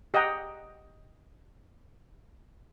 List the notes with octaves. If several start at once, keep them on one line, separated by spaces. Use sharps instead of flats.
G4 D#5 F#5 G5 A#5